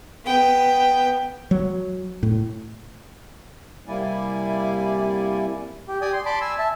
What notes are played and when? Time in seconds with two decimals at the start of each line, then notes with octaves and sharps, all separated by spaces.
0.25 B3 G5
1.51 F#3
2.23 A2
3.88 C3 G3 A#3 E4 D5 G#5
5.88 G4
6.01 G4 D5 G#5 D#6
6.13 C6
6.25 D5 A5 B5 C6 D6
6.41 G#5 E6
6.59 E5 A5